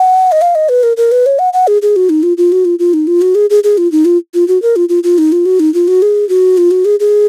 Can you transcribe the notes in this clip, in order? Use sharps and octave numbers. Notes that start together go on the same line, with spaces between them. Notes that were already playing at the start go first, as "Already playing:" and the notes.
Already playing: F#5
D#5
F5
D#5
B4
A#4
A#4
B4
C#5
F#5
F#5
G#4
G#4
F#4
D#4
F4
F4
F#4
F4
F4
D#4
F4
F#4
G#4
G#4
G#4
F4
D#4
F4
F4
F#4
A#4
F4
F4
F4
D#4
F4
F#4
D#4
F4
F#4
G#4
F#4
F4
F#4
G#4
G#4